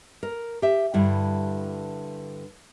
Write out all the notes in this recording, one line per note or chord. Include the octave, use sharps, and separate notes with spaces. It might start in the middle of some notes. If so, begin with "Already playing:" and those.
A#4
G4 E5
G2 D3 G3 E4